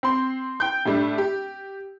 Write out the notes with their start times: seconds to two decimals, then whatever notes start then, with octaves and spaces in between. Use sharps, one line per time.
0.03 C4 C6
0.60 G5 G6
0.86 A2 G3 A3 D4
1.18 G4